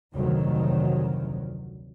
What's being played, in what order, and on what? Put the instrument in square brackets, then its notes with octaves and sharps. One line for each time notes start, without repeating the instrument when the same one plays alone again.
[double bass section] F1 D2 D#3 F#3